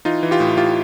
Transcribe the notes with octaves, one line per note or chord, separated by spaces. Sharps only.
E3 D#4 F4
E3
F4 G4
A2
A2 F4 G4